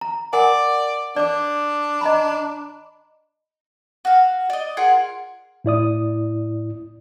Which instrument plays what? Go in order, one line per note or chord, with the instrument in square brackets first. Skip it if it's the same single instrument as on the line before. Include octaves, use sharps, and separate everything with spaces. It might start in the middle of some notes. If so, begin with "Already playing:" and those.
[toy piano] A#5
[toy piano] A#4 F#5 G#5 [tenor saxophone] D5
[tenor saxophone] D4 [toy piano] D5 D6
[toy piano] D#5 A#5 B5
[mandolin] F#4 F5
D5 D#5
F4 G#4 A#4 F#5
[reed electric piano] A2 E4 D5 D#6